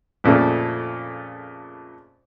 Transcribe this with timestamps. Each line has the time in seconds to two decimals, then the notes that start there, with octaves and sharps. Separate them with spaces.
0.24 F2 A#2 C#3 A3